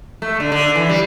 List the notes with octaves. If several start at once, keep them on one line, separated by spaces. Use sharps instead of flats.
A3
D3
D3
E3
G3